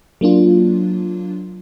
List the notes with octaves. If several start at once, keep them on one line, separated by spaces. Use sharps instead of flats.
F#3 A#3 D4 F4